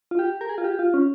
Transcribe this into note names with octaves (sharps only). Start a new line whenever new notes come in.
F4
G4
A#4
G#4
F4
G4
F4
C#4